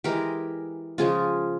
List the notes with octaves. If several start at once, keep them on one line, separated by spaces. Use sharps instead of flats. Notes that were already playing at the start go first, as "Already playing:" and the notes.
E3 G#3 G4 A#4
C#3 F3 G#3 F4 G#4